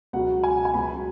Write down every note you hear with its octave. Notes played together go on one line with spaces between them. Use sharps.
C#2 B2 F#3 F#5
G#5
G#5
C#2 B2 F#3 B5